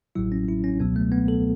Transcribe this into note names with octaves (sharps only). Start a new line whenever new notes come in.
A1 A2 F#3 E4
C#4
E4
C#4
C#2 B2 F#3 B3
A3
B3
A4